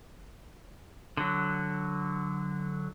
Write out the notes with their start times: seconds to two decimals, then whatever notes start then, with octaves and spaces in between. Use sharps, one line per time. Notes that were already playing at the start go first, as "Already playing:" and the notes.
1.17 D3 F#3